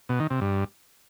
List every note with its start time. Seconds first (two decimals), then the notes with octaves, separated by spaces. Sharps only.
0.09 B2
0.20 D#3
0.30 C3
0.41 G2